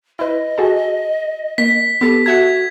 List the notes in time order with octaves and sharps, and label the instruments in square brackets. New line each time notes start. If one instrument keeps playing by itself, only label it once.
[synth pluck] E4 B4 [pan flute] D#5
[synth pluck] F#4 G#4 A4
[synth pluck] A#3 [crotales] B6
[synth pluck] B3 A4 [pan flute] G4
[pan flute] F#4 [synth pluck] A4 E5 F#5 [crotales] G#6